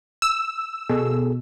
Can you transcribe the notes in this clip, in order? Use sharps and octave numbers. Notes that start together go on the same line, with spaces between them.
E6
B2 G#4 A4